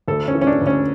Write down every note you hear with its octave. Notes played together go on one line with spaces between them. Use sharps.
D2 A4
C#4
E3
C#4
D4
D2
C#4